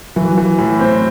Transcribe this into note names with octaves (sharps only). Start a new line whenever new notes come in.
E3 F#3
E3
A2
C4